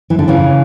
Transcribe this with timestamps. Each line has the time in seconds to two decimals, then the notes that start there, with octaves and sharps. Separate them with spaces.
0.10 E3
0.19 D3
0.28 C#3 E3